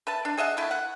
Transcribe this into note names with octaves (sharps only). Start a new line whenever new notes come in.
B4 E5 A5
D4
G#4 D#5 E5 F#5
A3 E4
F#5